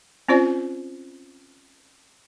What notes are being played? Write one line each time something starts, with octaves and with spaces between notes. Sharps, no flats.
C4 C#4 F4 C5 D5